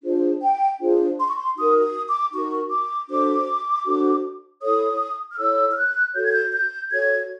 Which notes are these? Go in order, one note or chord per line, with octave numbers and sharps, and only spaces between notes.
D4 F4 G#4 C5
G5
D4 F4 G#4 C5
C6
C#6
C6
D#4 F#4 A#4 D#6
D#6
D6
D#4 F#4 A#4 C#6
D6
D4 F#4 A4 C5 D6
D4 F#4 A4 C5
E4 A4 C#5 D#6
F6
E4 A4 C#5 E6
F6
F#6
F#4 A4 C#5 G6
G#6
G6
G6
F#4 A4 C#5 G#6